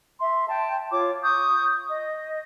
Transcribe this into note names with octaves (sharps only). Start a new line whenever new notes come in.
E5 C6
G5 A5
F4 C#5 D6
C#6 D#6 G6
D#5